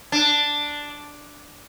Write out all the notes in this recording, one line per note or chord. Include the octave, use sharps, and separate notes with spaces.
D4